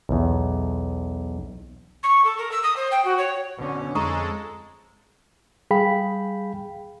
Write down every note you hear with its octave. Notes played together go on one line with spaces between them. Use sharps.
B1 E2
C#6
A4
A#4
E6
D#6
C5
G5
F#4
C#5
B2 D3 C#4
F2 G#3 A4 A#5 C#6 D#6
G3 G#4 F5 G5 B5 B6